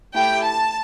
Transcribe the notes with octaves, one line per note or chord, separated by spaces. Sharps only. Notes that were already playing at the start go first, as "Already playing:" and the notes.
A3 E4 G4 G5
A5